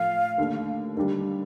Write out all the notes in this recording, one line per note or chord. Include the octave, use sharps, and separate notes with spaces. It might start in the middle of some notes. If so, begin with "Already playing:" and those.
Already playing: A2 F3 A3 F5
D#2 D3 A3
D#2 D3 G3 D4